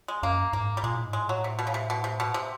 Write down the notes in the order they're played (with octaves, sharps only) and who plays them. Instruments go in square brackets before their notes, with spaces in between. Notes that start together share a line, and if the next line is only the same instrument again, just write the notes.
[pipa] G#3
[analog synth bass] F#2 [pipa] A#3
[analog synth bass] G#2 [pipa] A#3
[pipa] G3
[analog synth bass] A#2 [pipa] G#3
[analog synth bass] A2
G#2
[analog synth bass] A2 [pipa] G#3
[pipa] F#3
C3
B2
C#3
C3
B2
C3
B2
C3